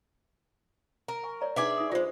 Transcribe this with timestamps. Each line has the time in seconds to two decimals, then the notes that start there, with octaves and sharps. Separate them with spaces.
1.08 A#4 A#5
1.24 G#5 C#6
1.41 C#5 D5 A#5
1.56 D4 D#4 G#4 B4 D5 E5
1.77 D#4 D#6
1.92 F#3 G#3 F4 C5